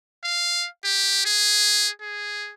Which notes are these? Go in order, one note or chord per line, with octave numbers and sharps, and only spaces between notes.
F5
G4
G#4
G#4